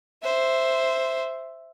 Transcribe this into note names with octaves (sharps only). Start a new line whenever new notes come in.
C5 E5